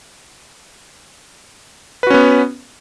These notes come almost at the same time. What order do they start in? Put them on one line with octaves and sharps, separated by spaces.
B4 F#4 C#4 B3